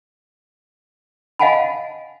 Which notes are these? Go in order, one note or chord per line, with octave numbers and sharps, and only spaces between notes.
D#5 F5 F#5 G#5 A5 B5